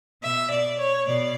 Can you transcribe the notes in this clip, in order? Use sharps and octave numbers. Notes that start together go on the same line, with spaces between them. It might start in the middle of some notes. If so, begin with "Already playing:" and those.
B2 E5
D5
C#5
B2 D5